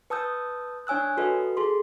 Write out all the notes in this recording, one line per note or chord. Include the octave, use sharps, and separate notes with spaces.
B4 A5 D#6 E6 G6
D4 C#5 G#5 E6 F#6
F#4 A4 B4 D#5
G#4 A4 C6